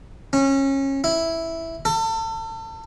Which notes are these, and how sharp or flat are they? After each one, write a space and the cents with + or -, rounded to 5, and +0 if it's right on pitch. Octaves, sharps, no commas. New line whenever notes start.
C#4 -25
E4 -5
A4 +30